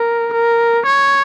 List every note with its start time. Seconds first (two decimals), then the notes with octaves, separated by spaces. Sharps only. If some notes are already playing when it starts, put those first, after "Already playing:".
Already playing: A#4
0.33 A#4
0.86 C#5